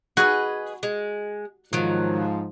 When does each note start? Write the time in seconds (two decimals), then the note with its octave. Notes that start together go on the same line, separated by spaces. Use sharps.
0.17 F#4 G#4 B4 D#5
0.83 G#3
1.73 G#2 D#3 F3 F#3